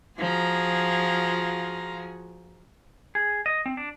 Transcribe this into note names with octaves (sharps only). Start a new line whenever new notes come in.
F3 F4 F#4 G#4 A#5
G#4
D#5
C4
D4